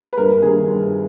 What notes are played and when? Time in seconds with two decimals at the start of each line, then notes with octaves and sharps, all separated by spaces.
0.13 B4
0.17 G1 A#4
0.42 G2 D#3 G#4
0.67 G1